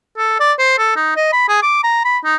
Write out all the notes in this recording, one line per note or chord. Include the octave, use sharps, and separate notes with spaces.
A4
D5
C5
A4
D#4
D#5
B5
G#4
D6
A#5
B5
D#4